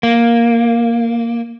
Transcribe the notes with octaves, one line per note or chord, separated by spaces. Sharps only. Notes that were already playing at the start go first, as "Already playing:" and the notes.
A#3